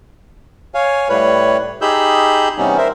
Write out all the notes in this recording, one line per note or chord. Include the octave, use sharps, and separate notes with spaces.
C#5 F5 G#5
A2 G3 B4 C#5
D#4 G4 G#4 B5 E6 G6
C3 E3 G3 B3 C#4 D#4
A#4 C5 E5